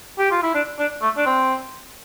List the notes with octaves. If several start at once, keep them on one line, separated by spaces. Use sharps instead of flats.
G4
F4
E4
D4
D4
A3
D4
C4